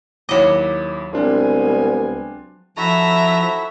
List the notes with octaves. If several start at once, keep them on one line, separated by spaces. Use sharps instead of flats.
D#2 F#3 E4 D#5 D6
C2 G#3 B3 C4 D4 F4 G#5
F3 E4 F#4 A4 E5 A#5